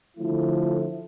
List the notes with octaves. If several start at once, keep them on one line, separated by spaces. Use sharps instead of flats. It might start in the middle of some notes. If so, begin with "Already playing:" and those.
D3 F3 A3 E4